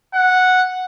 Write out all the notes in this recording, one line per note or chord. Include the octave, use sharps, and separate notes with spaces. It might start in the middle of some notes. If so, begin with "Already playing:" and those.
F#5